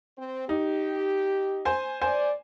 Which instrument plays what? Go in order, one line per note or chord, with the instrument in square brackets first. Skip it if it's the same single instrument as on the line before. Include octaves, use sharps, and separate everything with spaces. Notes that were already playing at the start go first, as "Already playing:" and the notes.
[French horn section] C4
[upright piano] D#4 [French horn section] G4
[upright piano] C5 G#5
[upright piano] C5 G#5 [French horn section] D5